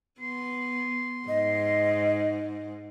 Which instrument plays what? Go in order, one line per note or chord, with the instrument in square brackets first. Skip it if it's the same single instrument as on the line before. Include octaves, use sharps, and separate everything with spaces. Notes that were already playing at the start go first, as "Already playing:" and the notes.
[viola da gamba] B3 [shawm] C6
[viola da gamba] G#2 [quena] D#5